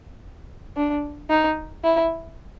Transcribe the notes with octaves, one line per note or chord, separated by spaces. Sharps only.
D4
D#4
E4